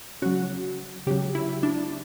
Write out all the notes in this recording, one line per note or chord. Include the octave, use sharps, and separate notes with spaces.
C#3 F#3 F#4
C#3 F#3 G4
E4
D4